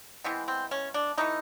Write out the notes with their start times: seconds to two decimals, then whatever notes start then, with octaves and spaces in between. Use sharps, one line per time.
0.24 E3 G#3 B3 C4
0.48 C4
0.71 C#4
0.94 D4
1.18 E3 A3 D#4